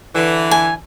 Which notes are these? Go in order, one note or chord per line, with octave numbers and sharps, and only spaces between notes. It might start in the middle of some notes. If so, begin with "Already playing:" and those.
D3 E3
G#5